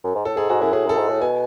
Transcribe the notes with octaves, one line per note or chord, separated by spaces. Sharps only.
F#2
G#2
A2 A4
G#2 G#4
G#2 F#4
F#2 E4
A2 G#4
F#2 A4
G#2
A2
B2 G#5